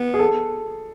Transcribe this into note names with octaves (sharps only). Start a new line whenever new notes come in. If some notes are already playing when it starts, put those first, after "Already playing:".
Already playing: B3
G#4
A4